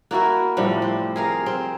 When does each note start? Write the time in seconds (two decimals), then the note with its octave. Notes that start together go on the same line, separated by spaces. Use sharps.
0.11 A#3 E4 F#4 A#4
0.57 A2 C3 F3 G3
0.82 C4
1.16 G#4 A#4 F5
1.46 C4